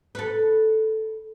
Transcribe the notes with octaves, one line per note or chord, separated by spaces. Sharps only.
A4 B4